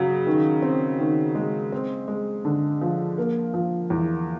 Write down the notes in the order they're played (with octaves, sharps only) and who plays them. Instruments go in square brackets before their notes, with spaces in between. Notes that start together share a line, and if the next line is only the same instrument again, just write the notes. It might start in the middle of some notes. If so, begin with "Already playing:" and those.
Already playing: [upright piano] C#3 F#3
D#3
C4
D#3
G#3
C4
G#3
D3
F3
A#3
F3
E2